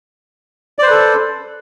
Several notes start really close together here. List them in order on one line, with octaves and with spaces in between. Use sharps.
D5 C5 B4 A4